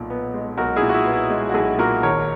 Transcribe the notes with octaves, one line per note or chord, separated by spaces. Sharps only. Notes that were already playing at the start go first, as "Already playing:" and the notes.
Already playing: B1 A#2 B3
B3
G#3
B1 F#4 A#4
E4 G#4
A#2
F#4
E4
B3
E4
G#3
F#4
B1 E4 G#4
A#2 F#4 A#4
G#1 A#4 C#5